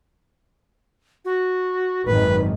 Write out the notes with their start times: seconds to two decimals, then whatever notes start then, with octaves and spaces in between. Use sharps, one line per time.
1.25 F#4
2.06 G#1 F#2 D#3 B4